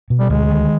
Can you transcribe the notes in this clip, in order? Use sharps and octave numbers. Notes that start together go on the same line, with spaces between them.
B2
G3
D2 G#3
D#3